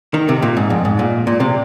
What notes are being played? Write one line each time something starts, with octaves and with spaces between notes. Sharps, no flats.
D#3
C3
A#2
G#2
F2
G#2
A#2
A#2
C3